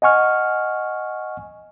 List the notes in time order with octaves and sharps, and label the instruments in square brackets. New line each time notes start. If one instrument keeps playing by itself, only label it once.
[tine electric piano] D#5 F#5 G#5 C#6 F6